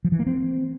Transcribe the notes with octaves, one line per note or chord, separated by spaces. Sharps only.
F3
E3
A#3
C4